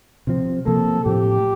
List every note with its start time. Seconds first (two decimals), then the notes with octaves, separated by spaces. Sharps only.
0.27 C3 F3 C4
0.66 C3 F3 A#3 A4
1.05 A2 F3 C4 G4